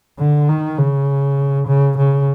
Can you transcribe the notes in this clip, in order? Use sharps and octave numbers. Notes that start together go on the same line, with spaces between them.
D3
D#3
C#3
C#3
C#3